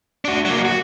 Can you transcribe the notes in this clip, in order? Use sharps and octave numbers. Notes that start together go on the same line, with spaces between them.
D4 F#4
F#3 A#3
F#4